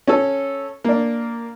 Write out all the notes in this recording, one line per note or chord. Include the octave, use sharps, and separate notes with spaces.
C#4 A4
A#3 D4